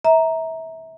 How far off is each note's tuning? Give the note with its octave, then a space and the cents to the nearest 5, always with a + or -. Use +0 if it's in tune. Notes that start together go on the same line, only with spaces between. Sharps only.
E5 -25 A#5 +0